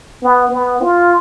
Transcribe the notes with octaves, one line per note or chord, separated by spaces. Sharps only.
B3
B3
F4